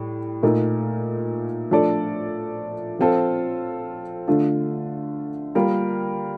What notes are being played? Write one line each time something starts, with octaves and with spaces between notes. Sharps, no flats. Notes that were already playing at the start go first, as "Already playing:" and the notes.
Already playing: A2 G3
A#2 A3 D#4 A#4
F3 A3 D4 A4 D5
F3 C4 F4 A4
D3 A3 D4 F4
G3 A#3 F4 A#4